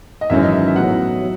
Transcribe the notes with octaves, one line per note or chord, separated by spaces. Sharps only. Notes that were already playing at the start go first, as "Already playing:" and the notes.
D#5
G#1 F#2 E3 G#3 C#4 E5
D#5
E5
E5
A2 F#3 B3 F#5
F#3